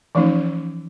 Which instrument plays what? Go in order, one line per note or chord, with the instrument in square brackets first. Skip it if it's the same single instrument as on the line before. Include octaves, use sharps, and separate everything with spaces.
[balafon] E3 F3 A3 C#4 D#4